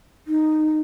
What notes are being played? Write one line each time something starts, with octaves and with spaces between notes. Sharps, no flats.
D#4